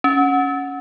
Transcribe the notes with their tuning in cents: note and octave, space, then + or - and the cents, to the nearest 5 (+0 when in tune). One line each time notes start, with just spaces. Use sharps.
C#4 +5